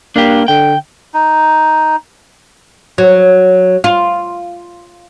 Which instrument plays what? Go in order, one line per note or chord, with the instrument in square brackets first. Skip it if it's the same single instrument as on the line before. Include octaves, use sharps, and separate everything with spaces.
[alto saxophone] A#3 [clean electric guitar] D4 G4
[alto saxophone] D3 [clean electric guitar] G5
[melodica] D#4
[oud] F#3
F4